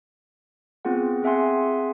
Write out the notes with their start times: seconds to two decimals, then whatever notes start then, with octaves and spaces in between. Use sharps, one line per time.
0.85 B3 C4 F4 G#4 F#5
1.23 C4 G#4 E5 F#5 G#5 C6